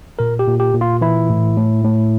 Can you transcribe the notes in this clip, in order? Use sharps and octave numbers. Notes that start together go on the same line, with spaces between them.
A#2 A#4
G4
A#2
G4
A#2
F4
E3 E4
A2
A2
A2